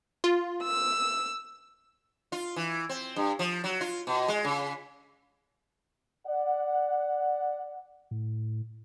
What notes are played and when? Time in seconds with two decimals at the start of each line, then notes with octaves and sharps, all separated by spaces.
0.24 F4
0.64 E6
2.32 F4
2.56 E3
2.89 C4
3.16 G2
3.39 F3
3.64 F#3
3.81 F4
4.07 B2
4.28 G#3
4.45 C#3
6.27 D5 F#5
8.11 A2